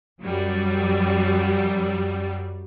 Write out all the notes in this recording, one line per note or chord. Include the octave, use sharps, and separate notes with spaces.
F#2 F#3 G3